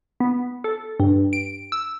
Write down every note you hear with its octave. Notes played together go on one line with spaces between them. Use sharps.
B3
A4
G2
D7
E6